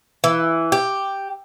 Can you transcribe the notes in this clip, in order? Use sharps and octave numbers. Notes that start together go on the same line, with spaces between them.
E3
G4